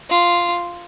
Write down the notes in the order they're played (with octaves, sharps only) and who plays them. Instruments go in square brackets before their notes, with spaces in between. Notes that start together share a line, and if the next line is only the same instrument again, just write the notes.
[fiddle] F4